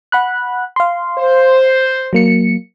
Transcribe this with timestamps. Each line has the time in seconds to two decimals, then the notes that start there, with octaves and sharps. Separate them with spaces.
0.12 F#5 B5 F#6
0.76 F5 C6
1.19 C5
2.13 F#3 A#3 C#7